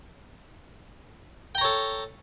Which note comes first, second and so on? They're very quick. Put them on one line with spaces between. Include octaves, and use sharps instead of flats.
G5 A#5 C#5 A4